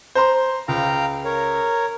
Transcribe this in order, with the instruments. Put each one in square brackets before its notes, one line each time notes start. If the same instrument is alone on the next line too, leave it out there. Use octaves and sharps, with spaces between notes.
[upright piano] C5 A#5 C6
[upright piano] C#2 [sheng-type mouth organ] F5 G5 A#5
[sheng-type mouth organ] A#4 C#5